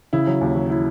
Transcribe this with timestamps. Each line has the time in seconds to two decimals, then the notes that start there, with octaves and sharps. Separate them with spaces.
0.13 C#3 E4
0.27 F#3
0.41 D#2
0.55 F#3
0.70 E4